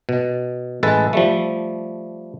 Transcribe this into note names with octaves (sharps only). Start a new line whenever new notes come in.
B2
A1 G#3 A4 B4 A5
F3 G3 A3